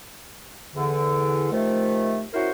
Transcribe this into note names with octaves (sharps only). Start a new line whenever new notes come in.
E2 D3
C3 D#3 F3 A3
C#4 E4 F#4 A#4 C5